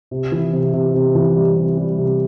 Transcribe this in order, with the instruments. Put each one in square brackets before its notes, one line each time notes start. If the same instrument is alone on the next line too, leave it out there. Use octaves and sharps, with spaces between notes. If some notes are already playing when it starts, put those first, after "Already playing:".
[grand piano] C3
E3
C3
C3
C3
E3
G3
C3
G3
C3